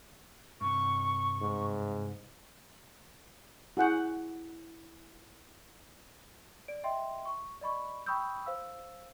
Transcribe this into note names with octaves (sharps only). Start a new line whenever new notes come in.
G2 C3 C#6
G#2
E4 F#4 G#4 F#5 G6
D5 D7
D#5 E5 G5 C6
C#6
D5 D#5 B5 C#6
G5 B5 C#6 D#6 E6 G6
C5 F5 E6